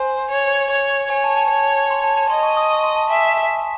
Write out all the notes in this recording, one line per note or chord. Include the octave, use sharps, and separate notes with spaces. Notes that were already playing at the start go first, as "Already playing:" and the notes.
Already playing: C5 G#5
C#5
C#5
C#5 G#5
A5
A5
C#5
C6
A5
A5
D#5 C6
C#6
D#6
C#6
C6
A5
E5 G#5